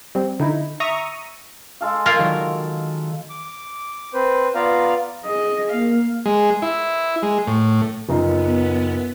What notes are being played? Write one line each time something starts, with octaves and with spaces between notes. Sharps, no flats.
G3 C4
D3 D#4 E4
E5 A#5 C#6 D#6
G#3 A4 F5
A#3 F4 A#4
D#3 F#3
D6
C4 B4 C5
B3 F4 D5 F5 A#5
G#4 D#5
A#3 F5
G#3
E4
G#3
A2
F#1 B3 D#4 F4